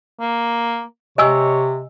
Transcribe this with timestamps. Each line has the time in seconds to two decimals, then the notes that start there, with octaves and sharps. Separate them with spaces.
0.20 A#3
1.18 C3 C#5 D#5 G#5 E6